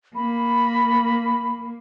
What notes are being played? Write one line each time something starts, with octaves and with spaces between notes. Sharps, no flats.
A#3 B5